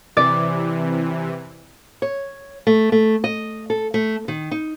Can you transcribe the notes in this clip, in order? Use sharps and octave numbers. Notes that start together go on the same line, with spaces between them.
C3 E3 D5
C#5
A3
A3
D#5
A4
A3
D#3
D#4